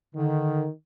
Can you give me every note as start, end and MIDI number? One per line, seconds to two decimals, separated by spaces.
0.15 0.66 50
0.15 0.71 51